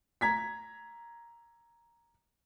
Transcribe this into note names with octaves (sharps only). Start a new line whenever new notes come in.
A#5 G#6 B6